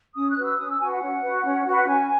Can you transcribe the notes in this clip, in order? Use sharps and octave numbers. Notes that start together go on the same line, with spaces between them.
C#4 D#6
F#6
F#4 B4
E6
C#4 D#6
E6
F#4 B4 G#5
F#5
C#4
F#4 B4
C#4
F#4 B4
F#5
C#4 G#5